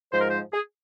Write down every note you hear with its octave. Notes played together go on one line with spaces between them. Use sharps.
G#2 F3 G#3 C5
A#4
C5
G#4